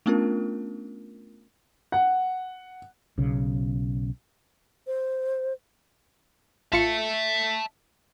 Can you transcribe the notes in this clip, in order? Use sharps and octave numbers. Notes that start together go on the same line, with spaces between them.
A3 B3 C#4 D4 F4 A#4
F#5
B1 C#3
C5
A1 F4 E5 A5 C#7